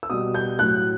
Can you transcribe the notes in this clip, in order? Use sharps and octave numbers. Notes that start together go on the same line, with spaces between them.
E6
B2 G3 D#6
G6
A2 F#3 F#6